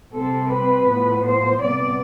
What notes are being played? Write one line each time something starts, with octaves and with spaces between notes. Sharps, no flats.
C3 G3 C4 A4
B4
A2 F3 B3
C5
C3 G3 B3 D5